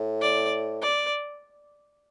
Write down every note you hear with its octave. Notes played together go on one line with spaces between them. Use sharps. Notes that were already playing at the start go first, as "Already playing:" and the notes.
Already playing: A2
D5
D5